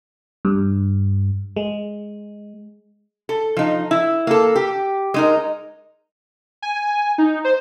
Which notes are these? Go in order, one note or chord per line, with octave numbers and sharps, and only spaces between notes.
G2
G#3
A4
F3 D#4
E4
A#3 A4
G4
G#3 D#4 A#4
G#5
D#4
C5